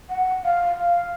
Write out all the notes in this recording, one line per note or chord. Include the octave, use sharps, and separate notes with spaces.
F#5
F5
F5